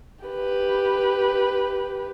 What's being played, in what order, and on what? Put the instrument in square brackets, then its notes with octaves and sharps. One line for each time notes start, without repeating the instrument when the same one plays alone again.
[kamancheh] G4 B4